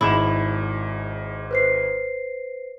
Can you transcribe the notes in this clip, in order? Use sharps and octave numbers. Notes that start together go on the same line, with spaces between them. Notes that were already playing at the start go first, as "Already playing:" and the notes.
G#1 G#2 E4 E7
B4 C5 C7